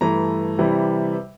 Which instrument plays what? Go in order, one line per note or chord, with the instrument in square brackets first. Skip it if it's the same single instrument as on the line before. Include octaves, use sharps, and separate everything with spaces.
[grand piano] G2 E3 A3 A#5
C3 E3 G3